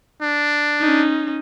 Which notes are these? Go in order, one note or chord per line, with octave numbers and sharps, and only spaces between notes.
D4
C#4 D#4